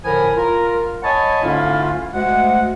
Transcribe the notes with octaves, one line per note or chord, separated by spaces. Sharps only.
A2 D3 F3 A#4 G#5 B5
F4 A#4
C#5 D#5 F#5 G#5 A5 B5
G#2 D3 A3 C#4 E4 F4
D2 G#3 F#5